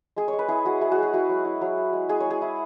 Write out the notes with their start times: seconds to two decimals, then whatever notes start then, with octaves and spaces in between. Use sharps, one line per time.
0.16 G#3 G#4
0.28 C#5
0.33 G#3
0.39 B4
0.49 E4 G#4
0.65 G#3 F#4
0.81 E4 G#4
0.92 F#4
0.98 G#3 G#4
1.13 E4 F#4
1.29 F#3
1.45 E4
1.61 F#3
1.77 E4
1.93 G#3
2.09 G#3 G#4
2.20 C#5
2.26 G#3 G#4
2.42 E4